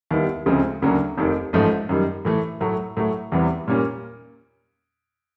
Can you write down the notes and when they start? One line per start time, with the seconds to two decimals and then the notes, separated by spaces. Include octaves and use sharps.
0.11 D#2 D#3 G3 B3 E4
0.46 D2 C#3 F3 G#3 C4
0.82 D2 C#3 F#3 A#3 D4
1.18 F1 D#2 D#3
1.53 A1 G#2 F3 A3
1.89 F#2 D#3 G3
2.25 A2 E3 A3
2.61 A2 F#3 A3
2.97 A2 F#3 A3
3.32 E2 C3 E3 G3 B3
3.68 A#2 G3 A#3 C#4